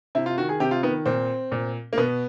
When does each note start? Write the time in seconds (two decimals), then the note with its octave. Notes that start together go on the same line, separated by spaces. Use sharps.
0.15 C3 E4
0.26 F4
0.38 D#3 F#4
0.49 G#4
0.60 C3 G4
0.71 F4
0.83 D#3 B3
1.06 A#2 C4
1.52 A#2
1.93 A#3
1.97 B2 B3